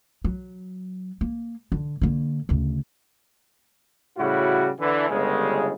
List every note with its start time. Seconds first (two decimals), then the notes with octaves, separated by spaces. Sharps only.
0.24 F#3
1.21 A#3
1.72 D3
2.01 D3 A#3
2.49 D2 C#3
4.17 A2 C#3 G3 E4 F#4
4.80 D3 E3
5.09 G1 C#3 G#3